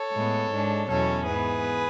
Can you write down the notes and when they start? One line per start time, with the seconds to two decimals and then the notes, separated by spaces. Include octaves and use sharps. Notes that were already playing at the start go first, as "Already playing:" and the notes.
Already playing: A4 C#5
0.12 A2 G#3 B3
0.51 G#2 G#3 D4
0.88 E2 B2 F#3 C#4 A4 C#5
1.27 G#2 E3 B3 G#4 B4